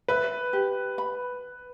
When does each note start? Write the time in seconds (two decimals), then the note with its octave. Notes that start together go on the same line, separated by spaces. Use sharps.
0.08 B4 E5
0.53 G4
0.98 B5